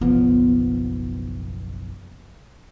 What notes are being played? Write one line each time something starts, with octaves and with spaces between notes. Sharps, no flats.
F#1 B1 F3 B3